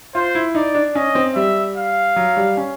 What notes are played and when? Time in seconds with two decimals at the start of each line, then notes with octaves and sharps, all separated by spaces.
0.14 F4 C5
0.35 E4
0.55 D#4 D5
0.75 D4
0.95 C#4 D#5
1.15 C4
1.35 G3 E5
1.76 F5
2.16 F#3
2.37 G3
2.57 C#4